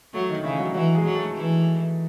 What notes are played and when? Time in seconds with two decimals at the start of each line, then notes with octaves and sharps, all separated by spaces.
0.14 F#3 A3
0.29 D#3 D#4
0.44 C#3 E3 E4
0.59 F#3 F#4
0.74 E3 F#3 F#4
0.95 G#3 G#4
1.04 F#3
1.15 A3 A4
1.35 E3